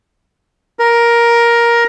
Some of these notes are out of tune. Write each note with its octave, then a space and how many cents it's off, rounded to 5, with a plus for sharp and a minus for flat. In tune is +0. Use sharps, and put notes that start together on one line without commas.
A#4 +10